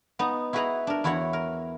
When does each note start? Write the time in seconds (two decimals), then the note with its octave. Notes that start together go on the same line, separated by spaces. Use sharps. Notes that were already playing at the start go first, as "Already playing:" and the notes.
0.19 B3 D#4
0.53 E4 F#4 G#4 B4 F#5 A#5
0.87 D4 A#4
1.04 E2 E4 F#4 C#5 F#5
1.33 A#4